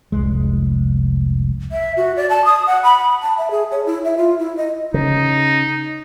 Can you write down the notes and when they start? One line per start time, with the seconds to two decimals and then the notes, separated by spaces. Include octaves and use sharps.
0.12 F1 C2 G#3
1.72 E5
1.97 F#4
2.17 D5
2.30 A5
2.45 D#6
2.67 F#5
2.84 B5
3.22 A5
3.38 E5
3.51 G#4
3.71 C#5
3.86 E4
4.05 E5
4.18 F4
4.39 E4
4.57 D#5
4.94 C#3 D#4